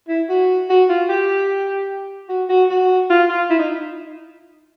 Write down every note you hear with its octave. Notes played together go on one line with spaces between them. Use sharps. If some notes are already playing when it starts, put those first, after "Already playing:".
E4
F#4
F#4
F4
G4
F#4
F#4
F#4
F4
F4
E4
D#4